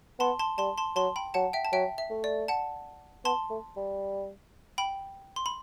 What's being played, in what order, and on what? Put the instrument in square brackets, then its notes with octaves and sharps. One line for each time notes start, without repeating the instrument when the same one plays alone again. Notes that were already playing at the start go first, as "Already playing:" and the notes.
[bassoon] B3 [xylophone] A5 C6
[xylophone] A5 C6
[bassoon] G3 [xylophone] A5 C6
[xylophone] A5 C6
[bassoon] F#3 [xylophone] A5 C6
[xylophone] G5 B5
[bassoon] F#3 [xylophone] F#5 A5
[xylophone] E5 G5
A5
[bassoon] F#3 [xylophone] E5 G5
[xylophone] E5
[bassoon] A3
[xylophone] D5
F#5 A5
[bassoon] B3 [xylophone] A5 C6
[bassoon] A3
G3
[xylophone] G5 B5
C6
B5